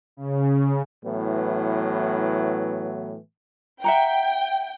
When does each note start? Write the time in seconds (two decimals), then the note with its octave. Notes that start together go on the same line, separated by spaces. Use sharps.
0.17 C#3
1.05 A2 E3 F#3 B3
3.84 E5 F#5 G5 A#5